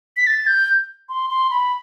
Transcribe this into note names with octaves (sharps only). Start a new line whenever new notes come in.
B6
A6
G6
C6
C6
B5